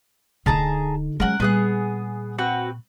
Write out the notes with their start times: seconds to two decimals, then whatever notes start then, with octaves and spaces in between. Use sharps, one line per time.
0.46 D1 D3 D#4 G#4 A5 A#5
1.20 F#3 G#3 C#4 A#4 F#5
1.40 A#2 G3 B3 G#4 F#6
2.38 C4 F#4 B4